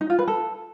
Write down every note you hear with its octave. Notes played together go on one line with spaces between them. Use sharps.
D#4
F4
B4
A4